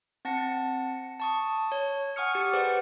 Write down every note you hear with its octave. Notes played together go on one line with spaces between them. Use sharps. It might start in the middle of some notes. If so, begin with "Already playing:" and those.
C4 F#5 A5 A#6 C#7
A5 C#6 D#6
C#5
F#5 G#5 C#6 D#6 F6 C#7
G4
G4 G#4 B4 C5 D5 F#5